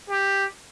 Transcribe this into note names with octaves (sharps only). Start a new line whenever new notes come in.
G4